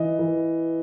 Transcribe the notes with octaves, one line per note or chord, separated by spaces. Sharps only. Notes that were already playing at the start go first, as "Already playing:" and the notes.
Already playing: E3 D#5
E3